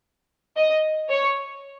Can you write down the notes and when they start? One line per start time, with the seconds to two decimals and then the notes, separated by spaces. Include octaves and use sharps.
0.57 D#5
1.09 C#5